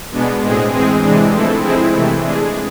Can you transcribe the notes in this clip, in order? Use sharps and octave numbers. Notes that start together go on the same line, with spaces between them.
B2 G#3 B3 D4
A2 G#3 C4 G#4
E3 G#3 C4 G#4
C3 E3 G#3 D4
F3 A3 C4 E4 A4
G#3 C4 E4 G#4
C3 E3 A3
G#3 D4 G#4